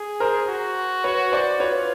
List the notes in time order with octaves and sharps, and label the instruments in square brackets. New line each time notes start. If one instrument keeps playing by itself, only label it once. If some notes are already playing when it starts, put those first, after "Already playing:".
Already playing: [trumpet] G#4
[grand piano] A#4 C5
[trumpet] F#4
[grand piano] B4 C#5
C5 D5
[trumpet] F4 [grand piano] B4 C#5